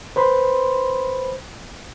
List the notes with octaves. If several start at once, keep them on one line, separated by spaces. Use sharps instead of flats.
B4 C5 B5 C6